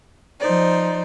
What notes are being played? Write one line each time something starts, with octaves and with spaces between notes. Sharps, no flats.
F3 D#4 C5 D5